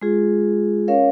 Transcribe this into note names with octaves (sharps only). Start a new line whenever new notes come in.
G#3 F4 G#4
C#4 A#4 C#5 F5